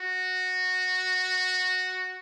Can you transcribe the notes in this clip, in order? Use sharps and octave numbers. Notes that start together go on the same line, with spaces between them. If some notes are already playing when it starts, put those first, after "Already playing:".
Already playing: F#4